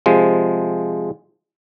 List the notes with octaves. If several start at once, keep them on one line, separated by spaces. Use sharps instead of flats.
C3 F3 G#3